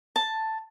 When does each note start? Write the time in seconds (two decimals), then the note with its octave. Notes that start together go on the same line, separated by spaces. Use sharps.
0.16 A5